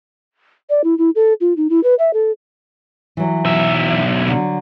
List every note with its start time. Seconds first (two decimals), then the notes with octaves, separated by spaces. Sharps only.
0.70 D5
0.84 E4
0.98 E4
1.15 A4
1.41 F4
1.57 D#4
1.70 E4
1.83 B4
1.99 E5
2.13 A4
3.17 E3 F#3
3.46 B1 E5
4.28 D3 F#3